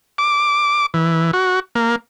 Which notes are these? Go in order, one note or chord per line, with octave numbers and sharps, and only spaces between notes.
D6
E3
F#4
A#3